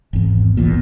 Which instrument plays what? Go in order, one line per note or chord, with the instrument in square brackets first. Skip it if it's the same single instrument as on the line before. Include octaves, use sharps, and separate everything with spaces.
[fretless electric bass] G#1 E2
F#1 B1 E2 A#2